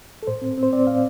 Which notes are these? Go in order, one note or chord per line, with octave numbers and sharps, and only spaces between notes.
A4
A2 C5
C4
C4
C5
C4 D5
A2 F5